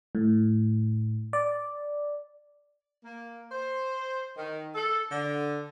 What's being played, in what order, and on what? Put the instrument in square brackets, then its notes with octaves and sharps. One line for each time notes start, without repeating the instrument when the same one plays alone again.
[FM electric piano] A2
D5
[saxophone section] A#3
C5
D#3
A4
D3